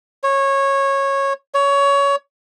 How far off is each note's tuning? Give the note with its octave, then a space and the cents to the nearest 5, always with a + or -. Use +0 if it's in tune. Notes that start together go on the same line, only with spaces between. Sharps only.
C#5 -15
C#5 +20